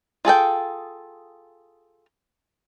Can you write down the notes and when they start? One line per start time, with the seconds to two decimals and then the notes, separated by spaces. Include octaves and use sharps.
0.25 F4 G#4 A4 G5